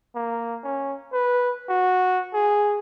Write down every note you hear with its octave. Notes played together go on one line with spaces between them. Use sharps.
A#3
C#4
B4
F#4
G#4